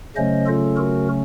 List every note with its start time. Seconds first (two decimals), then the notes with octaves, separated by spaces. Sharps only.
0.16 C#3 F#3 A3 C#4 C5 D#5
0.46 F4 A4
0.76 F#4 A#4